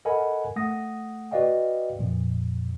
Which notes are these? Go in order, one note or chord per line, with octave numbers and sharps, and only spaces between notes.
A4 A#4 D#5 F#5 G#5 B5
A3 F#5 D#6 A#6
F#4 B4 D5 D#5 F5 G5
F2 A#2 F3